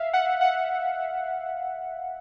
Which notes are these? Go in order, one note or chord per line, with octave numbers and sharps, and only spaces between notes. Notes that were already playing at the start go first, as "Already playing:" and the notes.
Already playing: E5 F5
F#5
F#5